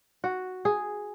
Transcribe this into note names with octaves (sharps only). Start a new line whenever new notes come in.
F#4
G#4